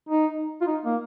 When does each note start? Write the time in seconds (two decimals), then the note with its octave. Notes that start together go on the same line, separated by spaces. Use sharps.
0.09 D#4
0.61 F4
0.67 D#4
0.85 A#3